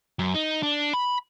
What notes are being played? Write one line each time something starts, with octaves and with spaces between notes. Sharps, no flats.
F#2
D#4
D4
B5